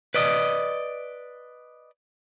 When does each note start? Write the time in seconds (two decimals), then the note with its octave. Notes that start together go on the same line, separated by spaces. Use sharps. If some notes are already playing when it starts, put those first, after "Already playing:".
0.14 B4 D5 D#5